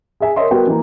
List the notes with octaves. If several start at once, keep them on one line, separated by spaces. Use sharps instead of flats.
G#4 E5 G#5
A#4 C#5 D#5 E5 C6
G3 B3 F#4 A#4 G5
E3 A#3